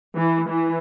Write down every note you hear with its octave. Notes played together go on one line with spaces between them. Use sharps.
E3
E3